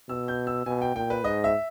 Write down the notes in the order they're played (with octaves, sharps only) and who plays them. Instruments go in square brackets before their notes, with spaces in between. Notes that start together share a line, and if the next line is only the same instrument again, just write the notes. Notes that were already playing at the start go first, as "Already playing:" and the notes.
[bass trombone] B2 [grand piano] E6
[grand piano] G6
E6
[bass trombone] B2 [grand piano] G#5
[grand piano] G5
[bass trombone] A#2 [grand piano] G5
[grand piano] B4
[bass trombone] G#2 [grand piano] D#5
[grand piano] E5